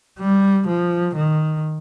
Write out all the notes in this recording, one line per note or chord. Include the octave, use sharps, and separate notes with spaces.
G3
F3
D#3